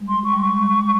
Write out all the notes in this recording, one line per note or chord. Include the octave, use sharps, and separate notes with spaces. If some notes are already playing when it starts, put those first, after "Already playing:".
Already playing: G3 G#3
C6
C#6
G3
G#3 C#6